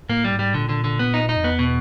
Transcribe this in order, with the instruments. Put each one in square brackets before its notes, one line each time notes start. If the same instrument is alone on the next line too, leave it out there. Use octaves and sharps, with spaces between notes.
[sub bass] A2 [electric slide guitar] A#3
[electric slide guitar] G3
[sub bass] G#2
[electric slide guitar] G3
[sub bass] A#2 [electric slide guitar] D3
[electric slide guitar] D3
D3
B3
D#4
D#4
[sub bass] F2
[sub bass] E2 [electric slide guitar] B3
[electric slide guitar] B2